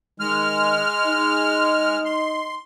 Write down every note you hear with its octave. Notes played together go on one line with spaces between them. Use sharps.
D#3 G#3 F6
D#4
C6